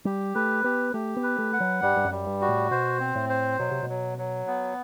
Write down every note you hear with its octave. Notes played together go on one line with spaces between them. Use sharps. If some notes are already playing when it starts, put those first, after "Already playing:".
G3 G4
A3 B4
B3 G4
A3 G4
B3
B4
A3
F#5
F#3
G2 G3
G2
F#2
G3
G2
F#4
A2
B2 C5
C4
A2
C5
B2 F#3
C3
B2
F#3
F#3
B3